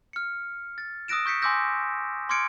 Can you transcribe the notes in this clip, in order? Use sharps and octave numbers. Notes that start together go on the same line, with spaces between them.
F6 C#7
A6
D#6 E6 F#6 A#6 D7 E7
C#6 G6 B6 C#7
G#5 C6 D6 E6 G6 A#6
C6 D6 F6 G#6 C#7 D7